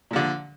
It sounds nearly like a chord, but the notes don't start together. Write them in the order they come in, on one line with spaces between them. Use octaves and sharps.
A#2 F3 D3